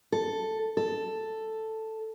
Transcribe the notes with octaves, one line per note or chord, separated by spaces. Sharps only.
A4
A4